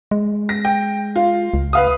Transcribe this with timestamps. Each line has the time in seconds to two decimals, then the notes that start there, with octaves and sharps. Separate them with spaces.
0.11 G#3
0.49 A#6
0.65 G5
1.16 F4
1.54 C#2
1.73 B4 F5 D#6